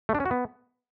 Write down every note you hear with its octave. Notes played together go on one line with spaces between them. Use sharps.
A3
D4
C#4
F#4
B3